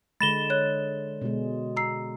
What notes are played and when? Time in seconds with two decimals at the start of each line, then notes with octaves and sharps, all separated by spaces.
0.20 D3 G#3 B5 A6 A#6 E7 G7
0.50 C#5 F#6
1.21 B2 G#3
1.77 A#5 E6 C7